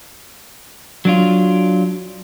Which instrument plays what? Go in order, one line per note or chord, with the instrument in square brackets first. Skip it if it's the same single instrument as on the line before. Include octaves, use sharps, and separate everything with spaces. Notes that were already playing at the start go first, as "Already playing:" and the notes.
[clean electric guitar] F#3 D4 F4